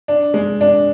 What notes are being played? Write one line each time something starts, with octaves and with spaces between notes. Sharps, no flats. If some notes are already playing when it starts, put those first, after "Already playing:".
D4
G#3
D4